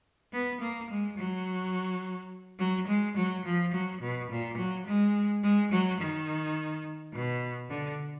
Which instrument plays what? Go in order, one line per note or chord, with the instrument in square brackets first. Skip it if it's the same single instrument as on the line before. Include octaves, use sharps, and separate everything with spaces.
[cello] B3
A#3
G#3
F#3
F#3
G#3
F#3
F3
F#3
B2
A#2
F#3
G#3
G#3
F#3
D#3
B2
D3